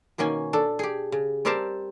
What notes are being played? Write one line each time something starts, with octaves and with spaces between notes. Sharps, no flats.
B2 D#3 A#3 C#4 G#5
D4 A4
G4 G#4
C#3
G3 C4 G4 A#4 C5 A5